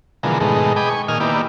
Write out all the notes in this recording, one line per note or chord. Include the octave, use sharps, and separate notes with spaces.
B2 D3 E3 F3 G#3 A#4
G#2 B2 D#3 G#3 A3
G#4 D#5 G5 B5 D6
G#5 C#6
A#2 D#3 D#5 G#5 F6
D#3 A#3 B3 E4 G4 D5